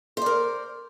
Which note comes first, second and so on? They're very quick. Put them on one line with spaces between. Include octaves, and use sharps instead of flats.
C5 D5 A#4